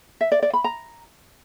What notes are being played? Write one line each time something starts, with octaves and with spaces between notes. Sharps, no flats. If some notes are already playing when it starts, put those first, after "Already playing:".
E5
D5
D5
B5
A#5